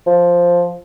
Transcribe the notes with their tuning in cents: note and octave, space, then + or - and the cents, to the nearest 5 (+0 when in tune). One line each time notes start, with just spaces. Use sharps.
F3 +0